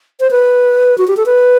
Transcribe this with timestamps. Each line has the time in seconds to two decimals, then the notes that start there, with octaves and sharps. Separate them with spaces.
0.20 C5
0.31 B4
0.98 F#4
1.07 G4
1.17 A4
1.26 B4